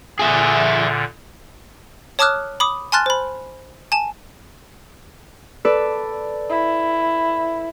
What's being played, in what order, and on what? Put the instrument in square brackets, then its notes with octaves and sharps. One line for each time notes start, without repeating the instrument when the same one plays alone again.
[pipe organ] A#2 D3 [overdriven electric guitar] G#4 E5
[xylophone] C#5 A5 D6 D#6 F6 F#6
B5 D6 D#6
G#5 A5 C6 F6 F#6 A6
C5 B5
G#5 A5
[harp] A4 B4 D5
[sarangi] E4